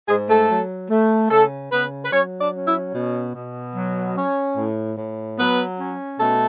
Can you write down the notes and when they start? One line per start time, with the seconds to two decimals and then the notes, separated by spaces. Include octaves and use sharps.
0.08 G#2 G#3 G#4
0.29 A3 A4
0.49 F#3
0.90 A3
1.31 C#3 A3 A4
1.71 C#3 B3 B4
2.04 B4
2.12 F#3 C#4 C#5
2.40 D4 D5
2.53 C#4
2.67 E4 E5
2.93 B2
3.34 B2
3.76 F#3
4.16 C#4
4.57 A2
4.97 A2
5.38 F#3 B3 B4
5.79 C#4
6.19 B2 A3 A4